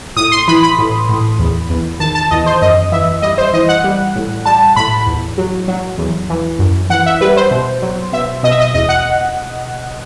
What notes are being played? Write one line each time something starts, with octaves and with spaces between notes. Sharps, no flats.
A2 D#6
C6
E3 B5
B5
A2
A2
E2
E2
D#3 A5
A5
E2 D#5
C5
F#2 D#5
E3 E5
G3 D#5
C5
E3 D#5
F#5
G3
A2
G3 A5
A2 B5
E2
F#3
F#3
E2
E3
F#2
E3 F#5
E5
G3 B4
C5
B2
F#3
B2 E5
B2 D#5
E5
D#5
E2 D#5
F#5